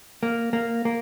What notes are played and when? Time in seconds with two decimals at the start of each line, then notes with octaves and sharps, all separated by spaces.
0.23 A#3
0.53 A#3
0.85 A#3